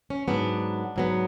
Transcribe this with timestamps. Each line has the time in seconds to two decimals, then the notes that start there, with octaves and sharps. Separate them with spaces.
0.10 C#4
0.28 G#2 F#3 B3 D4
0.96 G#2 F#3 B3